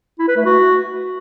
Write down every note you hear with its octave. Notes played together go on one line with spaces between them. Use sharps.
E4
B4
A3
F#4